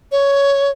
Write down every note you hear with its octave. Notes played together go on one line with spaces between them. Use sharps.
C#5